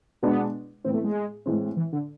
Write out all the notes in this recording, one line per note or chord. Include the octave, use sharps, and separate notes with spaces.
B2 G#3 B3 D4
A2 E3 B3 C4
A3
G#3
A2 E3 G#3 C4
E3
D3